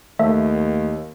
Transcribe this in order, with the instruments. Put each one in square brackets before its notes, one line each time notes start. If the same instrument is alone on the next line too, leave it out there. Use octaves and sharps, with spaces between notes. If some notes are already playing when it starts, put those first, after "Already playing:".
[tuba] D#2 [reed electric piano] A3 [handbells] E5